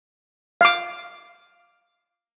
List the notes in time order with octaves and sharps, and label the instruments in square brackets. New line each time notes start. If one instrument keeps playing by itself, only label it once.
[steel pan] F5 D6